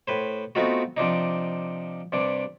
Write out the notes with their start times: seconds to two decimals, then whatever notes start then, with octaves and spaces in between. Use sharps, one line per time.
0.08 A2 B4 C5
0.55 A3 B3 C4 D#4 F4 F#4
0.97 C3 F3 D4 D#4
2.12 G2 C3 D4